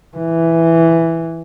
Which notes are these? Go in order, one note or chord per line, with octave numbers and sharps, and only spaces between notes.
E3